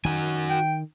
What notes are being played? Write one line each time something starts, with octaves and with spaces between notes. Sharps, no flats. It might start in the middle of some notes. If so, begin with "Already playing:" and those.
D#3 F#4 G#5
G5